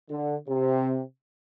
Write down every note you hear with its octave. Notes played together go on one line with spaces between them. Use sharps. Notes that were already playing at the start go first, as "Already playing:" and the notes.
D3
C3